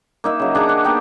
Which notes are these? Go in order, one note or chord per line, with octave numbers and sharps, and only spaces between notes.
A#3 D#4 E5
C#3 F#3
D4 G#4 F#5 A#5
F#5
A#3 B3 D#4 G4